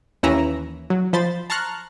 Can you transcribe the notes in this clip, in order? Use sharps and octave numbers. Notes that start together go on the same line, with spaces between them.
D#2 E3 C#4 E4 A#5 A#6
F#3
F3 C5 B5 A6
A5 A#5 C6 C#6 F6 F#6